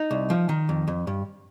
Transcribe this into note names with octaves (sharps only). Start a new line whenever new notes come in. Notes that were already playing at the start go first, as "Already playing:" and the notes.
Already playing: D#4
C2
F3
D#3
F2
F2
G2